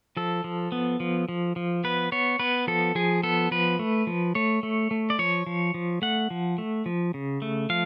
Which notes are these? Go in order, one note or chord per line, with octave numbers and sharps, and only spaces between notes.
F3 A4
F3
B3
F3
F3
F3
B3 B4
B3 C#5
B3 B4
F3 A4
F3 G#4
B3 A4
F3 B4
A3
F3
A3 C#5
A3
A3
D5
F3 C#5
F3
F3
A3 F#5
F3
A3
F3
C#3
A3
F3 F5